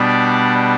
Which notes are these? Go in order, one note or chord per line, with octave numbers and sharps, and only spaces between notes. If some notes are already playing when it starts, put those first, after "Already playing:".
Already playing: B2 G3 B3 D4 D5